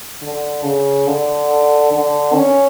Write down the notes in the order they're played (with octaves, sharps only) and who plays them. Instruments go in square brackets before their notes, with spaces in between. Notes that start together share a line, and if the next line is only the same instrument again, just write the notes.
[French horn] D3
C#3
D3
D3
C#4